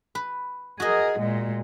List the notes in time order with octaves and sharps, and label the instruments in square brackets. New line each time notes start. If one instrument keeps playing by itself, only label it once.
[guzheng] B4
[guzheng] F#4 D#5 [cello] G#4 A#4
[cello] A#2 G#3